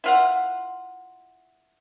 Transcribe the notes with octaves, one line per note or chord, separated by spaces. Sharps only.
E4 F4 F#5